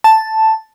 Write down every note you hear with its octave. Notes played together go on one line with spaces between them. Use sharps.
A5